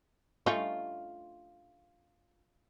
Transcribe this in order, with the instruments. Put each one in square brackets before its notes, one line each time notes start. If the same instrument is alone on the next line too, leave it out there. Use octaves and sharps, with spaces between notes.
[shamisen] A3 C#4 D#4 [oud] F4